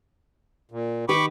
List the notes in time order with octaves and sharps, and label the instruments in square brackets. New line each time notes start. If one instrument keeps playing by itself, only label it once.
[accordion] A#2
[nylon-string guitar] D#3 G4 B4 [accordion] B5 C#6 D6